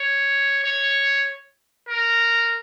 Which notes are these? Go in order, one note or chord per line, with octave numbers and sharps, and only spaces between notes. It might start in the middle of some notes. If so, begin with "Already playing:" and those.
Already playing: C#5
C#5
A#4